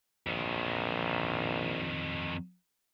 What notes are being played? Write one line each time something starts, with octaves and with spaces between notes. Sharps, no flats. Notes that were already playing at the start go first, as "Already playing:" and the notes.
A#1 F2 D#3